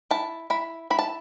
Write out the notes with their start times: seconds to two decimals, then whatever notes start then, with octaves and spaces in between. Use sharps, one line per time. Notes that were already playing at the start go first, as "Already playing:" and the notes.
0.11 E4 A5
0.50 E4 B5
0.90 E4 B5
0.99 A5